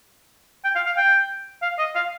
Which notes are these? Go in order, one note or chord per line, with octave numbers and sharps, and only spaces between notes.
G5
F5
F5
G5
F5
D#5
F5